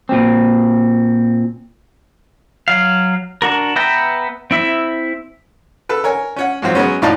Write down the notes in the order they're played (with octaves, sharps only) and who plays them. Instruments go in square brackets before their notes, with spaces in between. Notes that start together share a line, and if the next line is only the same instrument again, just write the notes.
[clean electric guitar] A#2 C4
[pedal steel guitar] F#3 F5
D4 F#4 A#4
B3 B4 E5 G5 A#5
C4 E4 E5
[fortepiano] A4 B4
A#4 C#5 G#5
C#4 C#5 F#5
G#2 F3 F#3 C4
F#3 G#3 B3 C#4
A#1 A2 D#4 D5 F5 A5